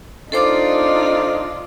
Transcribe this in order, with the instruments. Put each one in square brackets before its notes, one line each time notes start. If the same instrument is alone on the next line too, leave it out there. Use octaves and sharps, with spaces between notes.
[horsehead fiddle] D4 D#4 [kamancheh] F4 D5 [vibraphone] A4 C5 D6